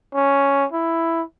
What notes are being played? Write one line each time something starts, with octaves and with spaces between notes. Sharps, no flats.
C#4
E4